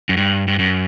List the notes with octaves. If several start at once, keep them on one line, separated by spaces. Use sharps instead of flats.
F#2
G2
G2
F#2